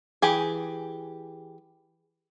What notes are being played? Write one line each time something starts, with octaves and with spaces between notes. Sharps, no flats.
E3 G4 G#4